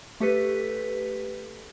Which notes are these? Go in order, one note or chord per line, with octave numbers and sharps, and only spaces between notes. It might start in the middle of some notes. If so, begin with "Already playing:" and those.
A3 G4 A4 B4 B6